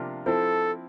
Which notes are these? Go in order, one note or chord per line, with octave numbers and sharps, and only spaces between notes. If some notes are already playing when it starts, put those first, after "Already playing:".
Already playing: C3 F3 A#3 D4 F4
F3 C4 E4 A4